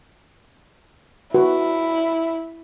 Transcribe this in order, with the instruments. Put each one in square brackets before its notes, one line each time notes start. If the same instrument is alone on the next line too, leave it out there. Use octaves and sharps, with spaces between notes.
[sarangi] E4 [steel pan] F#4 B4